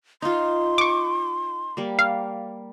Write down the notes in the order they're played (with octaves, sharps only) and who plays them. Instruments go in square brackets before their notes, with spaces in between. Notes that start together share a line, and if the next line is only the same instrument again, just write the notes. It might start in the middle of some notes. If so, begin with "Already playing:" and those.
[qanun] D#4 F4 [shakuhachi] C6
[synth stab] C#6 D6
[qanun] G3 A#3
[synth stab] F5